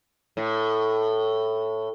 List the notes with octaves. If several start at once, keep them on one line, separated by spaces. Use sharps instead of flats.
A2